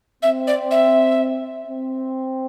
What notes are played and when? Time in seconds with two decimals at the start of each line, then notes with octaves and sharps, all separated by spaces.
0.22 C4 E5
0.47 D5
0.71 E5
1.67 C4